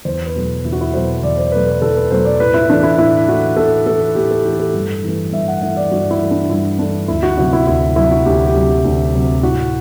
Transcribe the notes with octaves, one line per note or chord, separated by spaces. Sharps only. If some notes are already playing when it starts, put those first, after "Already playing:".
E2 C5
B4
B2 F#3 A3
E2 E4
F#4
E4
B2 F#3 A3 C5
E2 D5
C5
B2 F#3 A3 B4
B4
E2 A4
B4
B2 F#3 A3 C5
D5
A2 B4
E4
E3 A3 D4
E4
A2 E4
E3 A3 F#4
A2 A4
E3 A3 A4
A2 G4
A4
E3 G4
A3
A4
G2
E3 A3
G2 E5
F#5
E3 A3 E5
D5
G2 F#4
E4
E3 A3
D4
G2 E4
E3 A3 D4
D2 E4
F#4
C3 F#3 F#4
E4
D2 E4
C3 F#3 E4
F#4
D2 G4
G4
C3 F#3
D2
C3 F#3
A2 F#4